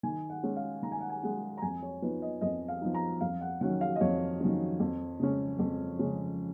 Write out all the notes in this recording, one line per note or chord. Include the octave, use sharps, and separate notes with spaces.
D#3 G#5
F#5
G#3 C#4
F5
D#3 A#5
G#5
F#5
G#5
G#3 C#4 F#5
A#5
F2 G#5
C#5
F3 B3 D#4 B4
D#5
F2 D#5
F5
F3 B3 D#4
A#5
F2 F5
F#5
D#3 F#3 C#4 F#5
F5
D#5
F2 C#5
D#3 F#3 C#4
F2
C#3 G#3 C#4
F2
C#3 G#3 C#4